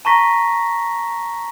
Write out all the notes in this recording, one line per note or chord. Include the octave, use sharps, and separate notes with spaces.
A5 A#5 C#6 A#6 B6